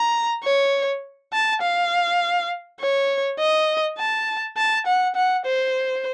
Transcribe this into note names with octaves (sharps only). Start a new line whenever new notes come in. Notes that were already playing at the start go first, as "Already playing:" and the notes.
Already playing: A#5
C#5
A5
F5
C#5
D#5
A5
A5
F#5
F#5
C5